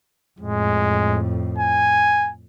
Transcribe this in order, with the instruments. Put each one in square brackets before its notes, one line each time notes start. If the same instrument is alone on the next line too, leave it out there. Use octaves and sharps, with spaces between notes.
[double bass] F2 A2 [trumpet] G#3
[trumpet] G#5